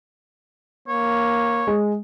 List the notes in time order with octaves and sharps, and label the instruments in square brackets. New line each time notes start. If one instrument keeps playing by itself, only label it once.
[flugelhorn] A#3 [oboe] C#5
[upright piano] G#3